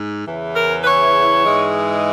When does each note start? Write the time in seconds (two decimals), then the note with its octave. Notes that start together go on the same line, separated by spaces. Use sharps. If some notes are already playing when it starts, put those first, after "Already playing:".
Already playing: G#2
0.25 E2 C#3 E3
0.56 A#4
0.81 B4
0.85 C#5
1.45 G#2 E3 G#3